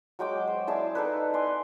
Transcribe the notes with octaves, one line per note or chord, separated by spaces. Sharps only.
F#3 G#3 G5 D6
C5
E4 G#4 D5 A5
D#4 A4 B4
D5 G#5 C6